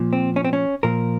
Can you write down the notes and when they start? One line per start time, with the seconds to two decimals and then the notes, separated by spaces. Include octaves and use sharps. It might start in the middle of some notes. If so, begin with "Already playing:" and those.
Already playing: A#2 F3
0.13 C4
0.36 C#4
0.45 C4
0.53 C#4
0.83 A#2 F3 A#4